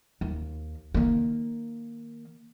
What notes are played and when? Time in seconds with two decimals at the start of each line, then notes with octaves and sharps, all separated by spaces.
0.21 D#2
0.94 D#3 A#3